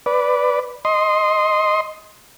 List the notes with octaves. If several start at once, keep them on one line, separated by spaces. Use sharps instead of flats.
B4 D5
D#5 C6